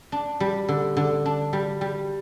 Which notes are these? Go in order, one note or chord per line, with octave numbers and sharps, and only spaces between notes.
D4
G3
D3
D3
D4
G3
G3